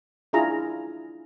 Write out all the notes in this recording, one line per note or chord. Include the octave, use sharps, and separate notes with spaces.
D4 E4 F4 G#4 A#5